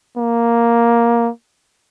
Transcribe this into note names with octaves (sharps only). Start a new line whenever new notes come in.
A#3